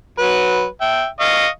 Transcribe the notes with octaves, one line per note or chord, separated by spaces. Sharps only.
F#3 B4
E5 G5
D#5 F5 C#6